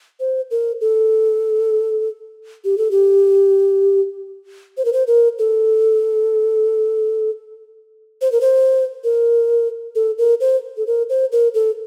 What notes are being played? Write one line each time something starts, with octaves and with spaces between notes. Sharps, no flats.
C5
A#4
A4
G4
A4
G4
C5
A#4
C5
A#4
A4
C5
A#4
C5
A#4
A4
A#4
C5
A4
A#4
C5
A#4
A4